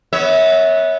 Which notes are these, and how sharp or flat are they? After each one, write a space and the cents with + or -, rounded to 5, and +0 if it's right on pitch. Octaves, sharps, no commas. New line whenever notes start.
B3 -5 C#5 +0 E5 -30